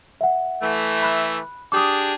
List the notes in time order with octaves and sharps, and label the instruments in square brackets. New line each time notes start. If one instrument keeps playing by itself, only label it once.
[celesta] E5 F#5
[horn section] E3 A3
[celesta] B5 F#6
[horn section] D4 G4 G#4 [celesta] D6 D#6